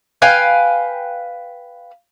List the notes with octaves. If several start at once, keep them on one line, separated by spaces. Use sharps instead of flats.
B4 F5 G5 G#5